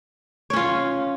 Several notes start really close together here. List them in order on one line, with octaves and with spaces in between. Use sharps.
C#5 C#4 F4